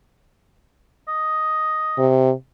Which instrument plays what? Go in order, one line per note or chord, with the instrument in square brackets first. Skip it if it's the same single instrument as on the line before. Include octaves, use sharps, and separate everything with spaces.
[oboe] D#5
[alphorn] C3